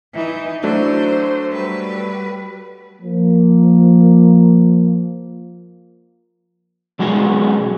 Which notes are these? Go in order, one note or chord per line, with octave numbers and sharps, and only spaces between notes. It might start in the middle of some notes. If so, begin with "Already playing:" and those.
E3 D#4
F#3 A3 D4 C5
G3 B4
F3 A#3
B2 F#3 G#3 F#4 G#4